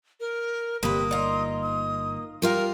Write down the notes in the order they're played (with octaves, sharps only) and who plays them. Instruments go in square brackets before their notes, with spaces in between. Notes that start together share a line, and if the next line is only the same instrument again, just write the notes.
[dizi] A#4
[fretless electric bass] G1 [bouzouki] C3 B4 [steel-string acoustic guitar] A#3 [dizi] D#6
[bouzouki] D#4 F4
[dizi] D#6
[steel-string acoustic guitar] G3 F4 F5 [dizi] A#4